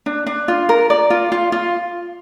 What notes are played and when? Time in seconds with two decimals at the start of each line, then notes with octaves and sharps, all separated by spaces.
0.06 D4
0.27 D4
0.48 F4
0.69 A#4
0.90 D5
1.10 F4
1.32 F4
1.52 F4